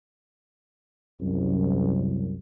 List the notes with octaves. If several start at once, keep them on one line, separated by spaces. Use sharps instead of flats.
C2 F#2